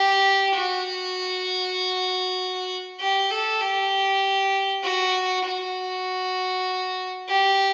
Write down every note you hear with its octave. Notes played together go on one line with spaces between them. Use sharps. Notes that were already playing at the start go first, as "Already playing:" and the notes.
Already playing: G4
F#4
G4
A4
G4
F#4
F#4
G4